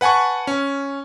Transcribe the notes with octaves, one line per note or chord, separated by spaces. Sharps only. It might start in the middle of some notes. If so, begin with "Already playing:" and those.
B4 F#5 G#5 A5 C#6
C#4